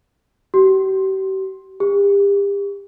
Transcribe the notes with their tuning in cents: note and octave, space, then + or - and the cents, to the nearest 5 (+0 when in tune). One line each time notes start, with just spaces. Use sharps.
G4 -40
G4 +35